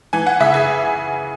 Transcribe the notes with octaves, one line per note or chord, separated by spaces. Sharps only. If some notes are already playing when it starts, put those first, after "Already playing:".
E3 G#5
F#5
C#3 E5
G#4